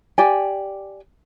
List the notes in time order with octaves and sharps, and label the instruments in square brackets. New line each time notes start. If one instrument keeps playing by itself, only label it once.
[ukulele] G4 D5 G5 G#5